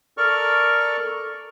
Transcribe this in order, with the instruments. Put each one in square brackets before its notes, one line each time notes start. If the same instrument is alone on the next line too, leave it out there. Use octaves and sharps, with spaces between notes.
[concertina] A4 A#4 D5 C#6 F6